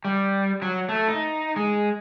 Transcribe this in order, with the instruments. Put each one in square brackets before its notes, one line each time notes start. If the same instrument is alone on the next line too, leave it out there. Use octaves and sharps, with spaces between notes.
[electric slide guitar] G3
F#3
A3
D#4
G#3